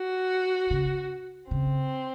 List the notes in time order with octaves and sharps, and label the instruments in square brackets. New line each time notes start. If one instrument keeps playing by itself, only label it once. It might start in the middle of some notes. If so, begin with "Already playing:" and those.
Already playing: [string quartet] F#4
[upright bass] C#3
[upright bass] C#3 [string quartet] C4